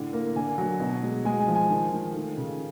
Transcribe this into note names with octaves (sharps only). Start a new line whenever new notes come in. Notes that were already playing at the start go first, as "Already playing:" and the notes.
Already playing: A2 D3
A#3
D3 G#5
F#3
B2
G#3
G#3 G#5
G#5
F3
G#5
D#3
D#3
A3
C#3